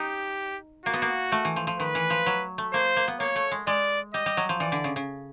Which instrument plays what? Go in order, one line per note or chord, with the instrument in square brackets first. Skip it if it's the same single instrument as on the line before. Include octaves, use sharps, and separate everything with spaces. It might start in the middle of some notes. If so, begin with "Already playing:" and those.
Already playing: [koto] D#4 [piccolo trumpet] G4
[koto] A#3 [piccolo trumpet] F#4
[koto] B3
A#3
A3
E3
F3
F3
[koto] D#3 [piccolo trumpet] B4
[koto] E3
F3
F#3
A3
[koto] A#3 [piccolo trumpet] C5
[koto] A#3
B3
[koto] A#3 [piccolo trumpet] C#5
[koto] A3
G#3
[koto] G#3 [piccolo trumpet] D5
[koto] G3 [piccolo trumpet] D#5
[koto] G3
F#3
F3
[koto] E3 [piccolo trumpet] D5
[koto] D3
C#3
C#3